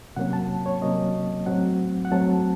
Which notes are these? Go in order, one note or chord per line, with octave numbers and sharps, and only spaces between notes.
C3 F#3 A#3 C#4 F#5
A5
C#5
C3 F#3 A#3 C#4 D#5
A2 F#3 A3 C4 F#5
F#5
A2 F#3 A3 C4 A5